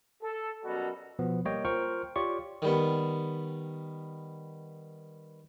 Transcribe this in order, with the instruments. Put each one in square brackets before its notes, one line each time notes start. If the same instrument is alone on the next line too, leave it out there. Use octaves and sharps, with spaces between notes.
[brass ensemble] A4
F#2 B2 G3 F#4 A4 A#5
[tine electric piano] B2 F3 B3
G3 A#3 C#5 D#5 G5
F4 A#4 C5 G5 C#6 F6
F4 G4 C#5 D5 C#6
[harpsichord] D#3 G3 B3